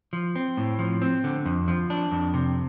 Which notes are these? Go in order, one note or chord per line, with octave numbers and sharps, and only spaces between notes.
F3
C4
A2
F3
C4
D3
F2
F3
D4
F2
C3